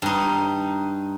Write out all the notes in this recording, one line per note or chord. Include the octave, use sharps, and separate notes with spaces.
G2 D#4